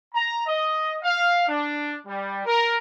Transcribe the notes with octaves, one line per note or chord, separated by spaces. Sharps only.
A#5
D#5
F5
D4
G3
A#4